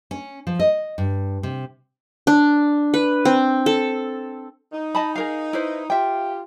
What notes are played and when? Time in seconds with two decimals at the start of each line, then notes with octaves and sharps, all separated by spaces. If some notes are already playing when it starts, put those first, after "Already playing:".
0.11 C#4
0.47 F3
0.59 D#5
0.98 G2
1.43 C3
2.27 D4
2.94 B4
3.25 C4
3.66 A4
4.73 D#4
4.95 D#5 A5 B5
5.15 G#4 A#4 F5
5.53 E4 B4 C5
5.90 F4 G4 E5 G5